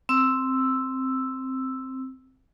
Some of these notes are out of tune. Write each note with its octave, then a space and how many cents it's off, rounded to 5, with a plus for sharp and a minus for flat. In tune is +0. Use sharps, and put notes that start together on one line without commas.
C4 +0 E6 +0